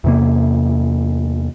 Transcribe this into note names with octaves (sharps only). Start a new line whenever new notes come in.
E2 C3 A#3